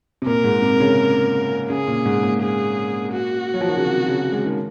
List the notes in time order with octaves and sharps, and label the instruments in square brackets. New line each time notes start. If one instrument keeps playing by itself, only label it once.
[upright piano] C3
[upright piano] A#2 [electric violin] A#4
[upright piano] G#2
C3
C#3
[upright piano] C#3 [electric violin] G#4
[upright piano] A#2
G#2
A#2
[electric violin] G#4
F#4
[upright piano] F#3
F3
D#3
C#3
C3
C#3
G#3
D#3